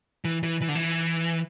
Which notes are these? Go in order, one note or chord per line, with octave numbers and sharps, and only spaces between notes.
E3
E3
E3
D3
E3